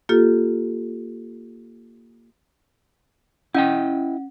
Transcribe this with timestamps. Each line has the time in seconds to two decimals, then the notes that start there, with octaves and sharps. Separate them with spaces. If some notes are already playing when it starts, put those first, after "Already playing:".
0.09 A#3 F4 G4 A4
3.55 C#4 E4 D#5 F#5 G5